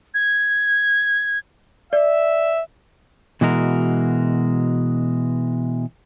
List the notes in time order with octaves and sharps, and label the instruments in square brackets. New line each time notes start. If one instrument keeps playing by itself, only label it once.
[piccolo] G#6
[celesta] D5 [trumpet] E5
[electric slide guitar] B2 E3 G#3 F#4 A#4